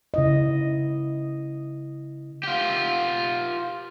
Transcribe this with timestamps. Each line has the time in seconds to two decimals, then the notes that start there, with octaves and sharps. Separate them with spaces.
0.14 C#3 E4 D#5
2.43 F4 G4